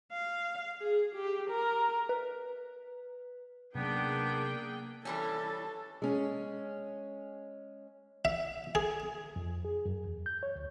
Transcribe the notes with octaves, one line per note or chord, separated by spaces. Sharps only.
F5
G#4
G4
A#4
B4
C3 F#3 A#3 B3 C#4 D4 G#4 G5
E3 G3 C#4 A4
G#3 C#4
E5
G#4
F2
G#4
F#2
E2
G6
C#5
D2